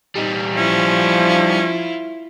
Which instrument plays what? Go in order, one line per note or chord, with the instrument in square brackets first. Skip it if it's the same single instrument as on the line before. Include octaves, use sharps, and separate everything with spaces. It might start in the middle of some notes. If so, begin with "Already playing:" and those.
[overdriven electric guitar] G3 D#4
[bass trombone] F3 [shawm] C#4 [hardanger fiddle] E4 F4